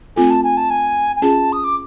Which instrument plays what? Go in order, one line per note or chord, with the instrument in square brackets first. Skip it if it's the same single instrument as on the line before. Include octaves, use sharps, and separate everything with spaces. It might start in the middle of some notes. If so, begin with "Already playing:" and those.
[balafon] A3 C4 F4 A4 [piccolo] G#5
[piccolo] A5
G#5
A5
G#5
G#5
[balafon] C#4 F4 G#4 [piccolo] A5
[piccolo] D#6
D6